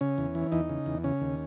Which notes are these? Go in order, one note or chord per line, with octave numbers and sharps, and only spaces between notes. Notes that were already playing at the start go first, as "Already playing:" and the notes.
C#3 C#4
E2
E3
E2 D#4
C#3
E2
C#3 C#4
D#2